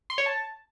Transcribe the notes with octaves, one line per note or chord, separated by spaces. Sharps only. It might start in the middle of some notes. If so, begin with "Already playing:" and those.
C6
C#5
A5